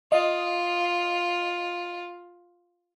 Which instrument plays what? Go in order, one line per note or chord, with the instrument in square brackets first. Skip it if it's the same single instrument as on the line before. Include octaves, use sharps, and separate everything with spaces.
[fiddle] F4 [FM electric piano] D#5